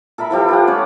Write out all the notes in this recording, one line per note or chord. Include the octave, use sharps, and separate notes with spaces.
A4 A#4 E5 B5
E3 F3 G4 A4
F4 G4 F#5
C#4 C#5 A5